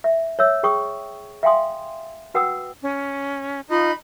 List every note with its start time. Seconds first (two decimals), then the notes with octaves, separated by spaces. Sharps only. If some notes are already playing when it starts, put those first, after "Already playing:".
0.04 E5
0.39 C#5 E5 E6
0.63 G#4 G5 C#6 D#6
1.43 E5 F5 G5 G#5 C6 D#6
2.34 F#4 B4 F#5 G5 D#6 E6
2.82 C#4
3.70 D#4 F4 D#5 B5